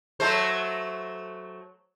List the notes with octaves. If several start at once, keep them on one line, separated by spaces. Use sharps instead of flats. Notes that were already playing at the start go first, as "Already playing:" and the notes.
F#3 A3 C5